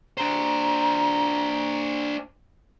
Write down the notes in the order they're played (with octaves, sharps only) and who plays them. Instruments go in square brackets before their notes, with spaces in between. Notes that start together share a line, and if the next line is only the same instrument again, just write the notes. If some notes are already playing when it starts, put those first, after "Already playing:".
[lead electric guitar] D4 C5 [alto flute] A#5